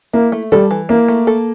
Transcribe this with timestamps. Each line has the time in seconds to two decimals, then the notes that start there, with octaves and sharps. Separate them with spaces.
0.13 A#3 E4
0.32 A3
0.52 G3 A4
0.71 E3
0.89 A#3 E4
1.08 A3
1.27 A4